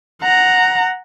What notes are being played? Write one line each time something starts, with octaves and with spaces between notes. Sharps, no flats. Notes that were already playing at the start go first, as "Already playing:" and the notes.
F#5 A#5